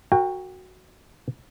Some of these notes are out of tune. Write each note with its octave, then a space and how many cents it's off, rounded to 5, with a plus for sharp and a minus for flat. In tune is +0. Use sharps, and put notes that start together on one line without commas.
F#4 +0 A#4 -30 G5 +25